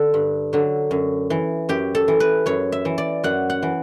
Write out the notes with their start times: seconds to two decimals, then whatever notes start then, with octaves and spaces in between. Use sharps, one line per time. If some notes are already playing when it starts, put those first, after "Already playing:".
Already playing: D3 A4
0.14 G2
0.53 D3 F#3
0.91 F#2
1.30 E3
1.69 F#2 G4
1.95 A4
2.08 E3
2.20 B4
2.46 F#2 C#5
2.72 E5
2.85 E3
2.98 D5
3.24 F#2 F#5
3.50 F#5
3.62 E3